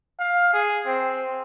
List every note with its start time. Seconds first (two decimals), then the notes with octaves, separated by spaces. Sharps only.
0.19 F5
0.53 G#4
0.86 C4